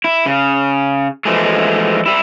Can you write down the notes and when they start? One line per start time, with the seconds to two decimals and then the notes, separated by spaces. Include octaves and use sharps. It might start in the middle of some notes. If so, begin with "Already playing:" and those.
0.04 E4
0.26 C#3
1.25 E3 F3 G#3 A3
2.06 G3 E4